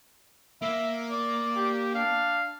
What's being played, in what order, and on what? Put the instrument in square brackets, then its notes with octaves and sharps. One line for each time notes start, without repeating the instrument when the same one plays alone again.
[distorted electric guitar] A#3 [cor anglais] E5
[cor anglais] D5
[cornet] G4
[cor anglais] D4 [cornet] F5